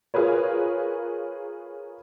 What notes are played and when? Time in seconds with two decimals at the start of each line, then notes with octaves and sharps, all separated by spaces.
0.14 F4 G#4 A#4 B4 C#5